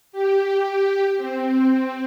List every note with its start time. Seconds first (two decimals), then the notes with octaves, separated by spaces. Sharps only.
0.12 G4
1.17 C4